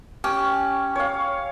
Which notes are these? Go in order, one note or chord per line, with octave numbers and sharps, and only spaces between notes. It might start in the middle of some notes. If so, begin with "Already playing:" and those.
C#4 G4
C#5 F5